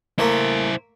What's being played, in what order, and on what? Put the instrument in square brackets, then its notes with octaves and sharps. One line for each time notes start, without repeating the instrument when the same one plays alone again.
[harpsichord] A3 A#3 E5 [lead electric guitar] E4 C5